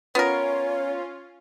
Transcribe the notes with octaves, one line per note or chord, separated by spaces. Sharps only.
B3 C#4 F4 A#4 C#5